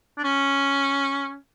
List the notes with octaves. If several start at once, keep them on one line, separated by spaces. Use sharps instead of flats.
D4
C#4